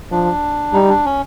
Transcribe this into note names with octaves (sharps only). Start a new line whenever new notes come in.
F3 D4
G3 D#4
D4
C#4